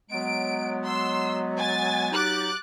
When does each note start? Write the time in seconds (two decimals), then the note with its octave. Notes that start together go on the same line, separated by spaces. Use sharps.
0.11 F#3 G#3 B3 D7
0.86 C6 E6
1.56 G#5 A6
2.12 F#3 D#4 G4 D6 F#6 A6